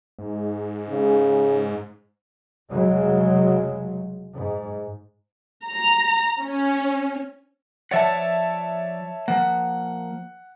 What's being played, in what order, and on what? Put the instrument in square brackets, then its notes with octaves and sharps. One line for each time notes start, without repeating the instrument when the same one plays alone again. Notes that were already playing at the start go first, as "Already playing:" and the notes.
[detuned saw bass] G#2
[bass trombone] C#3
[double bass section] F1 C#3 F#3 G#3
G#2
[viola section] A#5
C#4
[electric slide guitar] F3 D5 F#5 [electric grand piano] C#5 E5 A5
[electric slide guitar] F3 A#3 [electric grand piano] F#5